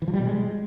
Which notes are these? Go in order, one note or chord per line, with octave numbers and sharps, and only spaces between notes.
E3
F3
G3
B2
G#3